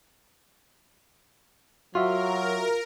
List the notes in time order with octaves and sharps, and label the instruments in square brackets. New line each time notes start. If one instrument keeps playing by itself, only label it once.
[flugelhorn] F#3 [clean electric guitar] F4 [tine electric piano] F#4 E5 [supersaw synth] A#4